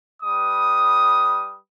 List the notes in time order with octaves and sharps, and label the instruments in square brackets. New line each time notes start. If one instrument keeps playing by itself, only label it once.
[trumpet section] G3 B4 D#6